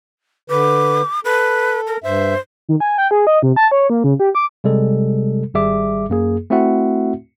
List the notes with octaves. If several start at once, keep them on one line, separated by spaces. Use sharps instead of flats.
D3 B4 D6
A4 B4
A#4
G2 C5 E5
D#3
G#5
G5
G#4
D#5
C3
A5
C#5
A#3
C#3
G4
D6
C3 G3 G#3 A4
G#1 G3 G#4 E5 D6
F#2 A#3 G#4
A3 C4 E4 F#4 E5 F#5